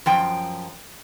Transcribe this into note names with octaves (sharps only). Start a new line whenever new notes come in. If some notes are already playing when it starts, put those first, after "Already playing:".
F#2 F3 G5